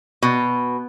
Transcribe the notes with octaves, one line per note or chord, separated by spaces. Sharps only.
B2